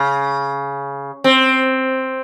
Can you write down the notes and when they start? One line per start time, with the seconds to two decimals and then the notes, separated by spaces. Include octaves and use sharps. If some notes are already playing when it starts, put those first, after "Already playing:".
Already playing: C#3
1.24 C4